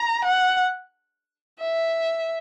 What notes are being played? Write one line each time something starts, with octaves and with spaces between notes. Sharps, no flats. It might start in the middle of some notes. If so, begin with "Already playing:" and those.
Already playing: A#5
F#5
E5